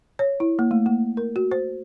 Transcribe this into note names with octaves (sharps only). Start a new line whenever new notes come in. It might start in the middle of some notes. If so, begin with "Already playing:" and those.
C#5
E4
A#3
A3
A#3
A#4
F#4
C5